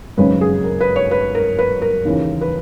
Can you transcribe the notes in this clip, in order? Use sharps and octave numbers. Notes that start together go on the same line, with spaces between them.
G#1 F#2 C#3 F#3 C#4 B4
G#4
A#4
B4
C#5
B4
A#4
B4
A#4
D#2 C#3 E3
B4